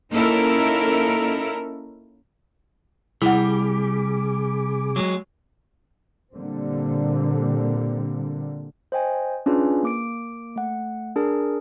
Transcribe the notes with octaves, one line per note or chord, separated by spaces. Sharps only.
A#3 C#4 D#4 E4 A4 A#4
C3 G3 E4 G#4 F#5 D6
F#3 G#3
A#2 D3 G3 A#3 C4
C5 D#5 G5 G#5
C#4 D4 F4 G#4 B4
A#3 D6 D7
A3 F#5
D4 G#4 A#4